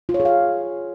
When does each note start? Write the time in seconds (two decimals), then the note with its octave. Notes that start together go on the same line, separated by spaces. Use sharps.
0.09 F4
0.14 C#5
0.20 G#4
0.25 F5